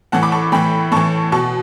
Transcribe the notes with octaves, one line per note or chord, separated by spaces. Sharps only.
A2 E3 F#5 A5
B5 D6
A5 C#6
A2 E3 G5 B5
A2 E3 A5 C#6
B2 A5 C#6